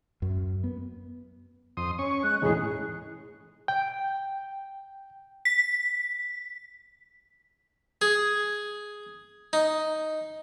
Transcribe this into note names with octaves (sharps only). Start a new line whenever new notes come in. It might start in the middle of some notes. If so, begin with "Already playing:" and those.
F#2
B3
F2 C6 D#6
C#4 C#6
G#3 F#6
E1 A2 C#4 D#4 G#4
G5
B6
G#4
D#4